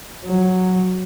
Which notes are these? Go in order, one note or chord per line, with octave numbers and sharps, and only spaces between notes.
F#3